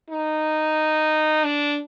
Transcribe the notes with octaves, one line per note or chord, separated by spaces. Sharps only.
D#4
D4